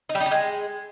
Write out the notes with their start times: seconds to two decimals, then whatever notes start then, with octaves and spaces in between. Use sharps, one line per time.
0.09 D#4
0.15 G3
0.20 D#4
0.26 G4
0.31 G#3